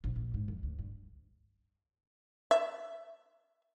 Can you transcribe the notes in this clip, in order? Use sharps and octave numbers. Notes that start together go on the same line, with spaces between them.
A#1
A#1
G#2
F2
D2
G2
E5